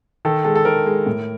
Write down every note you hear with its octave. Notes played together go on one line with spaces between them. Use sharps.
D#3 A4
G#3 A4
A4
D#3 A#4
G#3
A2